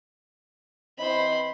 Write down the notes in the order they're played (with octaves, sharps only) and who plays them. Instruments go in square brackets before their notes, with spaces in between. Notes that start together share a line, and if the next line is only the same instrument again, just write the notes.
[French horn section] E3 C4 D#5 [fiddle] C5 B5